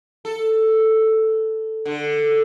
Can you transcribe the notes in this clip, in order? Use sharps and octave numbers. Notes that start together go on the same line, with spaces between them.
A4
D3